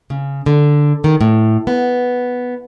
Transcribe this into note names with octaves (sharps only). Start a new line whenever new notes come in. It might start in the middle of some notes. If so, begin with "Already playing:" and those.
C#3
D3
D#3
A2
B3